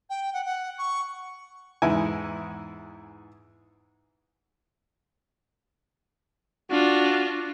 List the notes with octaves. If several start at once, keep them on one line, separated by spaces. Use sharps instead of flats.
G5
F#5
F#5
C#6
E2 G#2 E4 G#5
D4 F4 F#4